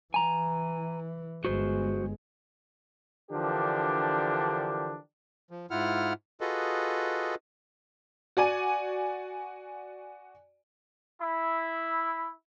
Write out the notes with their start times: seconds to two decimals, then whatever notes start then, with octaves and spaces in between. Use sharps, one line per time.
0.14 E3 G#5 A#5
1.45 G1 G#3 F#4 C5
3.31 D3 E3 F3 D4 G4 A#4
5.51 F3
5.71 G#2 E4 F4 F#5 F6
6.41 F4 F#4 G#4 A4 B4 D#5
8.37 F#4 D5 G#5 D#7
11.21 E4